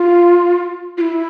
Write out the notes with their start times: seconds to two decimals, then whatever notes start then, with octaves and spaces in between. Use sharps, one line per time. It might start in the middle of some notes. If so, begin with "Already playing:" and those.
Already playing: F4
0.98 F4
1.01 E4